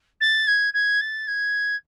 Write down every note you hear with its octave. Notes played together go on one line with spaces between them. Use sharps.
A6
G#6
G#6
A6
G#6